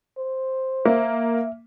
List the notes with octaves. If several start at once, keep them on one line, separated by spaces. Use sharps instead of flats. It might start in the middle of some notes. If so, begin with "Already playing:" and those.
C5
A#3 E5